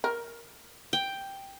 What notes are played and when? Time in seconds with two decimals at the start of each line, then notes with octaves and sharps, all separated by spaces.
0.04 A#4
0.93 G5